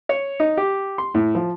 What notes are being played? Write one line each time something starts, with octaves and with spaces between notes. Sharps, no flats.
C#5
D#4
G4
C6
A2
F3